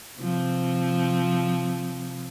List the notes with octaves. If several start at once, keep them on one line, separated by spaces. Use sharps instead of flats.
C3 F3 C4